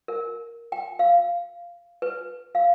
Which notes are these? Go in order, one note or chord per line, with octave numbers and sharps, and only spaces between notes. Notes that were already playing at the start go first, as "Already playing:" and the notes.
A#4
G5
F5
B4
F5